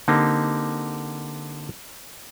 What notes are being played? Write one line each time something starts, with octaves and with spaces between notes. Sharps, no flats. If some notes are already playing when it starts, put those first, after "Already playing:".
D3 A#3 C4 D#4 G4